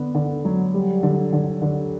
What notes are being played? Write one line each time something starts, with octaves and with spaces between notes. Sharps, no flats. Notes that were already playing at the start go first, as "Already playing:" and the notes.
Already playing: D3 B3
D3
F#3
G3
D3
D3
D3